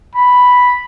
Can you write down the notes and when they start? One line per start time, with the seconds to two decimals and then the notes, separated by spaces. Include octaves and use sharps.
0.15 B5